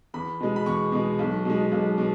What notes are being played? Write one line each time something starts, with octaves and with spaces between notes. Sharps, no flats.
E2 B5
B2 G#3
B5
E2 C#6
B2 G#3
B1
B2 G#3
B1
B2